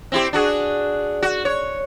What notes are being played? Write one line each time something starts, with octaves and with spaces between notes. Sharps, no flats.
C4 E4 G4
D4 F#4 G#4
F#4
C#5